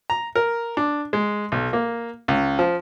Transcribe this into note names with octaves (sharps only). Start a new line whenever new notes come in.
A#5
A#4
D4
G#3
B1
A#3
C#2
F3